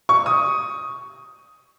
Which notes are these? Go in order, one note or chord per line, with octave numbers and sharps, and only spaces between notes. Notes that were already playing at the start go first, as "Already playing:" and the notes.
C#6
D#6